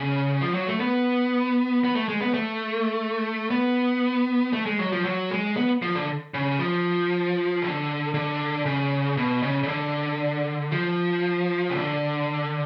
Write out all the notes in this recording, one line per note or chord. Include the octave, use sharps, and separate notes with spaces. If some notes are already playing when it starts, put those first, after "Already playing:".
Already playing: C#3
F3
F#3
A3
B3
B3
A3
G#3
B3
A3
B3
A3
G#3
F#3
F3
F#3
G#3
B3
F3
D3
C#3
F3
D3
D3
C#3
B2
C#3
C#3
D3
F3
C#3
D3